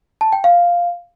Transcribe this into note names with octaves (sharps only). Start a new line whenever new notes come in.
A5
G5
F5